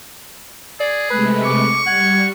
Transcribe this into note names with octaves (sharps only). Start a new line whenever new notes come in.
G#4 D5
C3 G#3 A3 B4 F#6
C#6 D6
G3 F#5 G#6